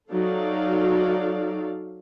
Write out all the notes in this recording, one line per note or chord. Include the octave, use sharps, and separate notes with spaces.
F#3 D#4 A4 D5 F5